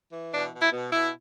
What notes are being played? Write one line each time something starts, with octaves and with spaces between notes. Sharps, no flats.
E3
B2 D4
B2
E4
B2
B2 E4